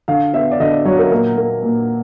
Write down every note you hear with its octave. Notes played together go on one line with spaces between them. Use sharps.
D3 F5
B3 E5
D5
D3 D#5
D5
F#3 C#5
A#4
A#2 A#4
A#3
A#2